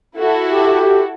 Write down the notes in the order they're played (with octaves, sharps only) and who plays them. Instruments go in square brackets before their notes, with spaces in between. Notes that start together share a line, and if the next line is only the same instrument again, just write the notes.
[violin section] E4 F#4 A4
[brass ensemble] G4